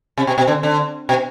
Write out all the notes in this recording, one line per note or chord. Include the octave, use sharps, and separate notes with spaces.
C3
B2
B2
D3
D3
B2